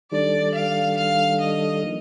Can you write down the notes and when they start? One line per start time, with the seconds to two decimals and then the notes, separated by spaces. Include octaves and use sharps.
0.12 D#3 G3 D4 A4 D5
0.55 F5
0.98 F5
1.41 D#5
1.83 F3 A#3 D#4